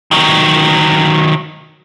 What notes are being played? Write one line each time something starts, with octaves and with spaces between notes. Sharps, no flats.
D#3 F#3